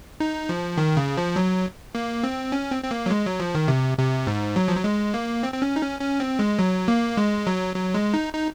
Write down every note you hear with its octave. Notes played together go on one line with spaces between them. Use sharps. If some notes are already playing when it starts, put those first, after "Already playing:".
D#4
F3
D#3
C#3
F3
F#3
A#3
C4
C#4
C4
C4
A#3
F#3
G#3
F#3
F3
D#3
C3
C3
G#2
F#3
F3
F#3
G#3
A#3
C4
C4
C#4
D#4
C#4
C#4
C4
G#3
F#3
A#3
G#3
F#3
F#3
G#3
D#4
D#4